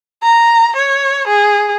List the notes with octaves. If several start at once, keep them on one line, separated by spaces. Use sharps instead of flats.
A#5
C#5
G#4